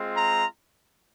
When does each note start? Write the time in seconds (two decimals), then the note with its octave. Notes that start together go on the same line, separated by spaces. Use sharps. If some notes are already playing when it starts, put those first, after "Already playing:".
Already playing: G#3 C4 F4
0.16 A#5